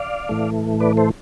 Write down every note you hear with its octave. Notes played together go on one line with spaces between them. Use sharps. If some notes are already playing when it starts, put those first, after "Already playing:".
Already playing: D5 F5
A2 E3 A3
B4 D5
A4 C5